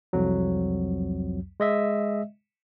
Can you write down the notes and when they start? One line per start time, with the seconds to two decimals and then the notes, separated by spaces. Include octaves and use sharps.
0.13 C2 F2 F#3
1.60 G#3 D#5 E5